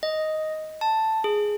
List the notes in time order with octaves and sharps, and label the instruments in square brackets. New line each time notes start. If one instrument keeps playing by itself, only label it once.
[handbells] D#5
A5
G#4